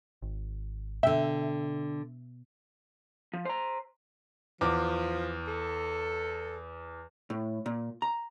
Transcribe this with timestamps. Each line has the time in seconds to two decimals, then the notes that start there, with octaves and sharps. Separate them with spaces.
0.22 G#1
1.03 B2 D3 E5 G5
3.34 F3
3.45 C5 A#5
4.61 E2 F3 D6
5.47 A4
7.30 A2
7.66 A#2
8.02 A#5